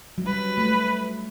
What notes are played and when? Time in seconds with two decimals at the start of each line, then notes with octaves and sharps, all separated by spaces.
0.18 F#3
0.25 G3 B4
0.58 A3